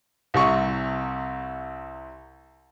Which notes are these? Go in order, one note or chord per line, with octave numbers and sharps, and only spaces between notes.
C2 C3 C#6